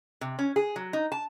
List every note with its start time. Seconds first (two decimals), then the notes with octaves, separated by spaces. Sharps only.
0.21 C3
0.39 C#4
0.56 G#4
0.76 F#3
0.93 D#4
1.12 A5